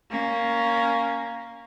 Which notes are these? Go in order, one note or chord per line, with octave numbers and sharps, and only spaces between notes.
A#3 C#4